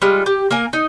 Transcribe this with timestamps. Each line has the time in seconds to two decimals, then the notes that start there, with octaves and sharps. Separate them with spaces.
0.02 G3 G#3 F4
0.26 G4
0.51 A#3 A#4 G#5
0.73 D#4